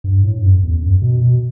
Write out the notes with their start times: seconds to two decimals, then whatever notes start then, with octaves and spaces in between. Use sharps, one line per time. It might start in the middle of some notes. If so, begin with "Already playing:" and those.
0.04 G2
0.24 A2
0.38 G2
0.43 F#2
0.63 E2
0.83 F#2
1.02 B2
1.22 B2